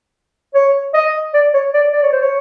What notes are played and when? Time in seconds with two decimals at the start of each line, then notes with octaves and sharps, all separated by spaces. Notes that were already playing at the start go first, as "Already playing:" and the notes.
0.55 C#5
0.94 D#5
1.34 D5
1.54 C#5
1.74 D5
1.93 D5
2.03 C#5
2.13 C5
2.22 C#5